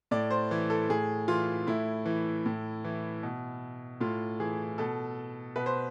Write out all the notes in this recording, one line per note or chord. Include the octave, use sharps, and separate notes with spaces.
A2 D5
C5
E3
A4
A2 G#4
E3 F4
A2 E4
E3
A2
E3
B2
A2 F4
E3 G#4
B2 A4
B2 B4
C5